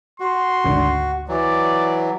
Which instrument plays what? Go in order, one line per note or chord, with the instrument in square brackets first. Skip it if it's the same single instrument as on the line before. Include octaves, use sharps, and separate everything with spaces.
[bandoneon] F#4 [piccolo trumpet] C6
[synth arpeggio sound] G#1 D2 D3
[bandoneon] E3 F#3 [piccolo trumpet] D5